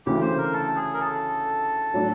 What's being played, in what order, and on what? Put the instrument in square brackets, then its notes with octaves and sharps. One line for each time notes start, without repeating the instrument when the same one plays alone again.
[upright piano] D2 C#3 E3 A3 [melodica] G4
[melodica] C5
A#4
A4
G#4
A#4
A4
[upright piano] A2 F#3 A3 D4